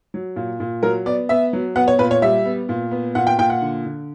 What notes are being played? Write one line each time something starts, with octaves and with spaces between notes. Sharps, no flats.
F#3
A#2
A#2
F#3 A#4
B3 D5
B3 E5
F#3
B3 F#5
C#5
A#2 B4
C#5
G3 E5
B3
A#2
B3
A#2 F#5
G5
A#2 G5
F#5
D3
D3